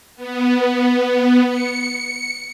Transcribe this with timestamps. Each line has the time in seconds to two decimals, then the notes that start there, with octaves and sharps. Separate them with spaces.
0.16 B3
1.46 C#7